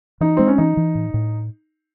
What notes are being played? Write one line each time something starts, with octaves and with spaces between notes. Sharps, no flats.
E3 D#4
G#3 C4
C#4
E3 D#4
E3
A2
A2